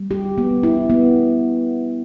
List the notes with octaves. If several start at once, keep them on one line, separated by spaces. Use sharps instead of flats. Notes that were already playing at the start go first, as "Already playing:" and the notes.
Already playing: G3
G4
B3
E4
B3